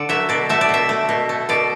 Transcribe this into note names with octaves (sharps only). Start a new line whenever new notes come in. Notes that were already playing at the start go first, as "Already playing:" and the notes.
Already playing: D3 A4 D5
F#3 A3 E5
B2 D5
A3 E5
D5
B2 E5
A3
B2
A3
B2 D5